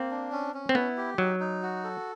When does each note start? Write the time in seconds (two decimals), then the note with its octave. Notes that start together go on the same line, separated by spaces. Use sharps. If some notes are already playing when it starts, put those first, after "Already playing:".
Already playing: A#3 C4
0.11 D4
0.32 C#4
0.54 C#4
0.69 C4
0.75 B3 E4
0.97 G4
1.18 F#3 D#4
1.40 D#4
1.63 F#4
1.84 A4